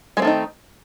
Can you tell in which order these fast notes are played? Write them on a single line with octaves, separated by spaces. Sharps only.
G#3 C4 A3 D#3 D#4